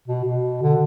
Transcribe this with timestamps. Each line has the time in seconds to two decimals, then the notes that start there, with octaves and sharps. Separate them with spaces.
0.08 B2
0.25 B2
0.63 D3